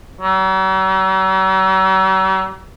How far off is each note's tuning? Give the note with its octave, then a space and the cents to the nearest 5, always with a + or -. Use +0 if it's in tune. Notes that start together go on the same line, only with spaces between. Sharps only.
F#3 +45